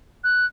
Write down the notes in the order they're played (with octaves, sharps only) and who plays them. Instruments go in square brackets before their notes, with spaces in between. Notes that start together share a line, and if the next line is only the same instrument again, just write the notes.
[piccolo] F#6